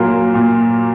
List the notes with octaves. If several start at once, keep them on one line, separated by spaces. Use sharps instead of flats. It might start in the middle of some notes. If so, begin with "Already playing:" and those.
Already playing: A#2 F#3 A#3 F4
A#2